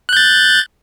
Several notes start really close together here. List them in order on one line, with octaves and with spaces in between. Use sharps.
F#6 G6 A6